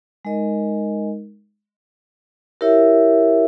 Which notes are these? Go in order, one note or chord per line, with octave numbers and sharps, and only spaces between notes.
G#3 D#4 A#4 D#5
E4 G4 A#4 C#5 E5